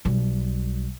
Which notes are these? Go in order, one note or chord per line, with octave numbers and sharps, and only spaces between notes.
B1 G3